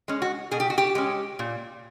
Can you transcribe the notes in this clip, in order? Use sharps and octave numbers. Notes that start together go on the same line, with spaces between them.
G#3 C#4
F#4
B2 G#4
G4
F#4
G4
G#3 C#4
A#2